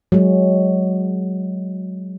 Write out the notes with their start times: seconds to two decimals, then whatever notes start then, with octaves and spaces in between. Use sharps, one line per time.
0.12 F#3 G#3